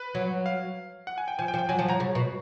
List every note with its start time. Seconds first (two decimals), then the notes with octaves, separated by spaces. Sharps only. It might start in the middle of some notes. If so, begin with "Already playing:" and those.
Already playing: B4
0.15 F#3
0.46 F5
1.07 F#5
1.18 G#5
1.28 G5
1.39 F3 G#5
1.48 G5
1.54 F3
1.59 G5
1.69 F#3 G#5
1.79 F3 A5
1.88 F#3 A#5
2.00 C#3
2.15 B2